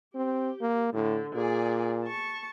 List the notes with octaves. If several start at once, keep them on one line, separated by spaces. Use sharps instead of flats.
C4 G4
A#3
A2 D3
A#2 G#4 D5
A5 C#6